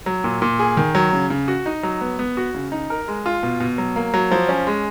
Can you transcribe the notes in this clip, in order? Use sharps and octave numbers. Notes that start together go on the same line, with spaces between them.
F#3
A#2
A#2
G#4
D#3
F#3
C#3
C#3
F#4
D#4
F#3
B3
B3
F#4
C#3
D#4
A#4
G#3
F4
B2
B2
F#3
A#3
F#3
F3
C#4
G#3